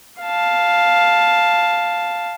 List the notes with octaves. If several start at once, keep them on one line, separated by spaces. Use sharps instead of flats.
F5 A5